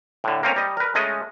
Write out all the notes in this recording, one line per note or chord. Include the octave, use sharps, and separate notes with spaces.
A2 D3
A#3 C4 C#4 C#5
G3 D#5
A#4 B4
G#3 A3 C#4 D#5